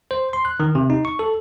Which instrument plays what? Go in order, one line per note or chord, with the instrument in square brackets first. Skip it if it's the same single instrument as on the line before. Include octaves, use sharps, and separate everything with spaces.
[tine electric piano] C5
C6
F#6
D#3
C3
D#4
C#6
A4